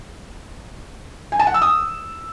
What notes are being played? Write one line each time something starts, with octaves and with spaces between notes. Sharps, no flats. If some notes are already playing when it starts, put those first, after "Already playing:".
G#5
A5
F#5
E6
D#6